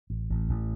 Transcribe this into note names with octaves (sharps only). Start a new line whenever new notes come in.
A1
A1
A1